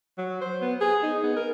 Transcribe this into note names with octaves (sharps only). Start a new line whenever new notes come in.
F#3
C5
B3
G#4
D#4
B3
A#4